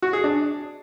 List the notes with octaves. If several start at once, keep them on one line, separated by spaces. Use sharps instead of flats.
F#4
G#4
D4